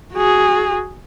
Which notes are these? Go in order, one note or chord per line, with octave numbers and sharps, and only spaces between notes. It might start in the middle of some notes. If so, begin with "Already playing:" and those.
F#4 G#4